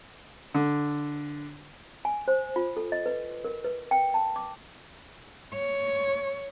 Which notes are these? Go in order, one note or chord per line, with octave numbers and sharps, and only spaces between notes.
D3
G#5
C5
F4
A4
D#5
B4
A#4
B4
G5
A5
D6
C#5